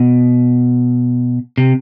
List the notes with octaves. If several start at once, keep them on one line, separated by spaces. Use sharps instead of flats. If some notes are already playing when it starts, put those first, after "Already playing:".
Already playing: B2
C3